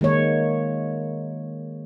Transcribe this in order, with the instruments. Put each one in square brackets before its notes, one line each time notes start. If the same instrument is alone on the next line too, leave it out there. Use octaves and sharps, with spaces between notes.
[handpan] D#3 G#3 A#3 C#5